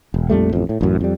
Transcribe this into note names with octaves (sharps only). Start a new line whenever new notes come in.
E1
A#1 F2 G3 A3
A1 F2
A2
A1 F#2
F2 G3